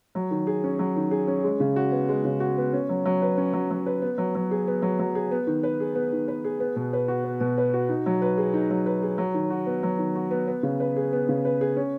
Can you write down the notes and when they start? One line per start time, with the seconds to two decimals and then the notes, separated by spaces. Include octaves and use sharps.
0.15 F#3
0.31 D#3
0.47 G#4
0.64 C#4
0.79 F#3
0.96 D#3
1.11 G#4
1.28 C#4
1.44 G#3
1.60 C#3
1.76 F#4
1.92 B3
2.09 G#3
2.25 C#3
2.40 F#4
2.58 B3
2.73 C#4
2.89 F#3
3.05 F#3
3.22 B4
3.37 C#4
3.53 F#3
3.71 F#3
3.86 B4
4.02 B3
4.18 F#3
4.35 F#3
4.51 G#4
4.67 B3
4.82 F#3
4.99 F#3
5.15 G#4
5.31 B3
5.47 D#3
5.63 B4
5.80 G#4
5.95 B3
6.13 D#3
6.28 B4
6.44 G#4
6.60 B3
6.76 B2
6.93 B4
7.08 F#4
7.24 B3
7.40 B2
7.58 B4
7.73 F#4
7.89 D#4
8.06 F#3
8.22 B4
8.38 G#4
8.54 D#4
8.70 F#3
8.86 B4
9.02 G#4
9.18 F#3
9.34 D#3
9.50 F#4
9.66 B3
9.83 F#3
9.99 D#3
10.15 F#4
10.31 B3
10.47 B3
10.63 C#3
10.80 B4
10.97 G#4
11.13 B3
11.29 C#3
11.45 B4
11.61 G#4
11.76 C#4